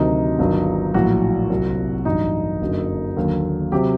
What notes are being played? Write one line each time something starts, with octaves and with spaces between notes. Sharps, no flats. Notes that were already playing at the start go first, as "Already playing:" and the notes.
Already playing: D2 C3 D#3 F#3 D#4
G1 G2 D#3 F#3
A#1 A2 F#3 F#4
C2 C3 F#3
A1 G2 F#3 D#4
F#1 F#2 D3 F#3
D#2 D3 F#3
C3 F#3 G4